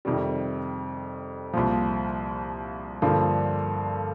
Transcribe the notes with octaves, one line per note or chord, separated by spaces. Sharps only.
F2 C3 D#3 G3
C2 A#2 F3
G2 D3 F3 A#3 D4